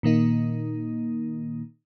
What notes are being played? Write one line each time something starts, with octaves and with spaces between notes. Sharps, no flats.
A#2 D#3 A#3 D#4